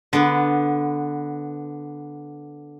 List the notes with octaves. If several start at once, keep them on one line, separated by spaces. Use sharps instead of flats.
D3 B3